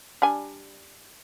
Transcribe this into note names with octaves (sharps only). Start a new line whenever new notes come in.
G3 D4 G#5